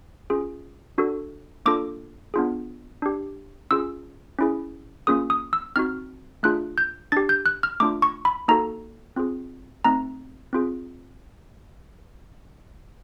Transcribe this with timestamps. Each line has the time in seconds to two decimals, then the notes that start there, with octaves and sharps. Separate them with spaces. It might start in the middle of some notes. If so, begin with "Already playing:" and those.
0.30 C#4 F4 G#4
0.98 D4 F#4 A4
1.66 A#3 D4 F4 A4 D6
2.34 B3 D4 F4 G#4
3.02 D4 G4
3.71 C#4 F4 G#4 E6
4.39 C#4 E4 G#4
5.07 A#3 C#4 F4 G#4 D#6
5.30 D#6
5.53 E6
5.76 C4 D#4 F#4 F6
6.43 A3 D4 F4 G#4 F#6
6.78 G6
7.12 D4 G4 A6
7.29 G6
7.46 F#6
7.63 F6
7.80 A3 D4 F4 D6
8.02 C#6
8.25 B5
8.48 A#3 D#4 F#4 A4 A#5
9.16 C4 F4 G#4
9.85 A3 C4 D#4 A#5
10.53 C4 F4 G#4